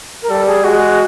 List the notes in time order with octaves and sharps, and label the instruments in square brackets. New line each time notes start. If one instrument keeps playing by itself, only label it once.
[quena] A#4
[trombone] G3 [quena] A4
[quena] G#4
[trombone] G#3 [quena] F#4